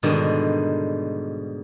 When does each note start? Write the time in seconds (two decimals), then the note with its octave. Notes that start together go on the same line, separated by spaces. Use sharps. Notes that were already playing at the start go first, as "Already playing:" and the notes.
0.03 G#2 B2 D3 D#3 G3 G4